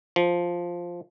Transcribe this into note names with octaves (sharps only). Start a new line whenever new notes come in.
F3